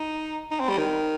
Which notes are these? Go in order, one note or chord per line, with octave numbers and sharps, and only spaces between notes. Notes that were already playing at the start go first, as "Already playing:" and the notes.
Already playing: D#4
D#4
C4
G3
D#3